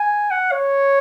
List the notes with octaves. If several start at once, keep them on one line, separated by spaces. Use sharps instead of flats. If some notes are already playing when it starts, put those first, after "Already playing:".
Already playing: G#5
F#5
C#5